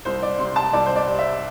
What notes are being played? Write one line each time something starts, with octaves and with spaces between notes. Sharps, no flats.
C2 C5
D5
C3 C6
A5
C2 D5
C5
D5
G3
E5